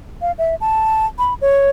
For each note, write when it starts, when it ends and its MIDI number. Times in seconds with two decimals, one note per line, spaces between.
0.22 0.32 77
0.38 0.55 76
0.61 1.06 81
1.19 1.34 83
1.41 1.70 73